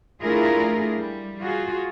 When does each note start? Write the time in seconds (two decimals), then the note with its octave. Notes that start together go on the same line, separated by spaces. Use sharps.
0.21 A3 D4 E4 F4 G#4 A#4
0.98 G3
1.41 F4 F#4 G#4